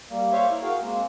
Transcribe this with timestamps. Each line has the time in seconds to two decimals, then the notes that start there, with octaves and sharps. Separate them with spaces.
0.10 G3 A#3
0.32 A#3 C5 C#5 E5 F5
0.51 E4
0.62 F#4 G#4 A#4 F5 G5
0.81 G#3 A#3 C4